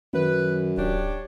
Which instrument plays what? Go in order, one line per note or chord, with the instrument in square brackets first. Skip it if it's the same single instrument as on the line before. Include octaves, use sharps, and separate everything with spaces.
[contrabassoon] F#2 [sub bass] D#3 [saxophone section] B4
[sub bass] D1 [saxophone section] D4 G4 C#5